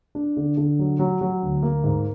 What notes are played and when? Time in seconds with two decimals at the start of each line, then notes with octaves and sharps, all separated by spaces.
0.15 D4
0.37 D3
0.57 D3
0.79 F#3
0.99 F#3
1.21 F#3
1.42 D2
1.63 A#3
1.84 G#2